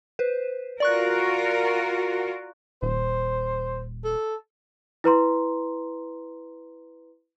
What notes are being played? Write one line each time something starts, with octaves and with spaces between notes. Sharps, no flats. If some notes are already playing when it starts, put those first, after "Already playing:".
B4 C5
F4 F#4 A#4 D5 C#6 F#6
D#1 C5
A4
E4 B4 A#5 C6